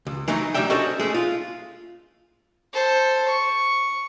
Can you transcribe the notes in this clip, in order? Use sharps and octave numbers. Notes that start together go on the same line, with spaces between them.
C#2
E3 F#3 A3 D#4
D2 F#3 G3 E5 G5
C#4 F#4 A4 C5 C#5 D#5
G#3 A3 C#4
F4
A4 C5
C#6